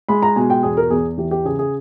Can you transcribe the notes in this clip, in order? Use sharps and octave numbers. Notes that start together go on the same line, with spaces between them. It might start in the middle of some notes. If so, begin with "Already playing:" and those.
G#3 B5
A#5
B2 G#5
G5
E2 G#4
A#4
E2 G#4
E3 G4
G4
C#3 G#4
G#4